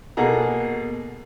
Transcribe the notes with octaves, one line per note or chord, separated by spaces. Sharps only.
B2 A#3 G#4 A4 F#5 A#5